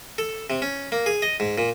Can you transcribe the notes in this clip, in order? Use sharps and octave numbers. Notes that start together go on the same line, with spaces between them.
A4
C3
C#4
A#3
G#4
D#5
G#2
A#2